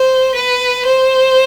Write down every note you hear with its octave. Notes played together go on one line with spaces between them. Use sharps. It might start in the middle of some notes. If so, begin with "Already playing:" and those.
Already playing: C5
B4
C5